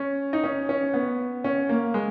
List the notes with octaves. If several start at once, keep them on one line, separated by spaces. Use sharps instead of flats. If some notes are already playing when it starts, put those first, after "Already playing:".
Already playing: C#4
D#4
C#4
C#4
B3
C#4
A#3
G#3